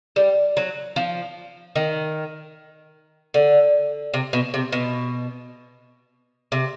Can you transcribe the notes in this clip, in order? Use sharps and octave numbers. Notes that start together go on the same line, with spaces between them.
G3
F#3
F3
D#3
D3
C3
B2
C3
B2
C3